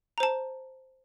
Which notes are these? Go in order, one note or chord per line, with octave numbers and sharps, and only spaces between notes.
C5 A5 A#5